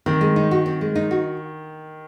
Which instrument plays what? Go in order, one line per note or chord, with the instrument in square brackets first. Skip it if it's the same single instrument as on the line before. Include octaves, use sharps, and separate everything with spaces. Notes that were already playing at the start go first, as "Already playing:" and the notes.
[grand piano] D#3 [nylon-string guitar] C4
[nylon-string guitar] G#3
D#4
F#4
C4
G#3
D#4
F#4